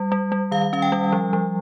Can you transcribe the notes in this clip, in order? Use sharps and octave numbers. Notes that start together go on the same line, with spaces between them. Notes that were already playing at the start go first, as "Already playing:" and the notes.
Already playing: G3
G3
G3
D#3 F5
C#4 F5
G5
G3
F3
F3